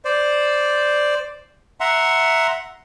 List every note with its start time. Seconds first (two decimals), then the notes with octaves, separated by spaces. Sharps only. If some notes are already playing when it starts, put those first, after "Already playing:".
0.05 C5 D5
1.80 E5 F#5 A#5 C6